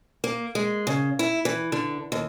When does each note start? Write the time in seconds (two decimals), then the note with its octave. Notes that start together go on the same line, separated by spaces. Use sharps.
0.24 A#3
0.55 G#3
0.87 C#3
1.19 E4
1.45 E3
1.72 D3
2.12 D#2